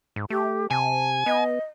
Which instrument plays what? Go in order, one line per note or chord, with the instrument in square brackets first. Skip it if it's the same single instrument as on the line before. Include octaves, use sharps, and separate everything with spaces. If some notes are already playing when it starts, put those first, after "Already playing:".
[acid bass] G#2
[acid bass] A3 [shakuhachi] G4
[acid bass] C3 [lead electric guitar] G#5 [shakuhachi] A5
[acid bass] B3 [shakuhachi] D#5